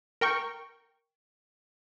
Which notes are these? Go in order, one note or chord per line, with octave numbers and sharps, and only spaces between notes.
A#4 G5 C#6